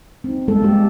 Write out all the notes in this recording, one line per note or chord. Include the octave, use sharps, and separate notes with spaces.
C4 D#4
G3 G#3 A#3 B3 A4
G3 G#3 G4